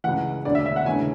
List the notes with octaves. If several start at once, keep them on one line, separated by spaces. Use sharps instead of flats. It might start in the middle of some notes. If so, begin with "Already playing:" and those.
C#2 C#3 E3 F#5
E1 D2 D3 D5
E5
E5
F#5
E1 D2 C#3 E3 G#5